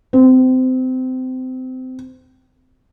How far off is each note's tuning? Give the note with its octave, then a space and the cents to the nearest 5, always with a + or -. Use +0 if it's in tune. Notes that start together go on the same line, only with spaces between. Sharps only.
C4 -25